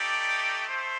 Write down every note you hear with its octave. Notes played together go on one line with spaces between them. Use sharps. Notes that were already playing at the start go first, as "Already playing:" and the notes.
Already playing: A3 D#4 G4 D5
A3 C5